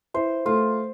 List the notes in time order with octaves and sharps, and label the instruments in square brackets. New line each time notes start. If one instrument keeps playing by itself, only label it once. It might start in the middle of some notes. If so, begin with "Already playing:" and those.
[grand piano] E4 [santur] C5
[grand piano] A3 [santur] F4